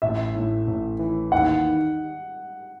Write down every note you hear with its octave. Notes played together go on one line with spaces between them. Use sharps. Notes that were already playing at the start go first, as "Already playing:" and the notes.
A1 E5
A2
A1
E3
D#2 F#5
D#3